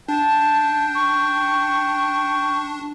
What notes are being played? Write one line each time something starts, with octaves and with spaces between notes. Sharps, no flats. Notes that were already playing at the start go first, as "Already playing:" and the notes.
D4 G5 A5
C#6